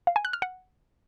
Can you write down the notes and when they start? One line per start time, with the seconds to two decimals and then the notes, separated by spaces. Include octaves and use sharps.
0.07 F5
0.16 G#5
0.25 F#6
0.33 F6
0.42 F#5